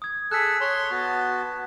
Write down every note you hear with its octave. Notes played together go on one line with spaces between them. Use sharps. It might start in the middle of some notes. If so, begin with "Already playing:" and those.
D#6 G#6
G#4 A4 E6 F#6 B6
C#5 C6
B3 F#4 A5